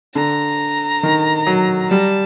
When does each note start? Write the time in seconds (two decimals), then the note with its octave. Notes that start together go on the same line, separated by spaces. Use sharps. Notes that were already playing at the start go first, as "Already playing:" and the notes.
0.15 D3 A#5
1.03 D#3
1.47 F#3
1.91 G3 A5